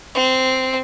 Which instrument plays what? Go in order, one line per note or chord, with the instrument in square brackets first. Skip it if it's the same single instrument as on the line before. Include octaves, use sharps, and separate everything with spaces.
[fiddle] C4